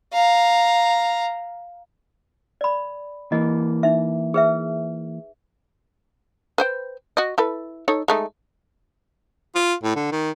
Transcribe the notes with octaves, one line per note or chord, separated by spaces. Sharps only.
F5 A#5
D5 B5
E3 A#3 D#5
D#4 E5
G#4 B4 E5
B4 C5 G5
F#4 D#5
E4 A4 B4
D#4 A4 C#5
G#3 A3 D#4
F4
A2
D3
D#3